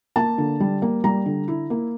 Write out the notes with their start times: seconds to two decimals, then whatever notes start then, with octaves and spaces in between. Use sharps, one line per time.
0.16 A#3 A5
0.38 D3
0.60 G3
0.82 A#3
1.04 G3 A#5
1.26 D3
1.48 E4
1.70 A#3